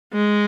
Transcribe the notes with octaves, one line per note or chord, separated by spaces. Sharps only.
G#3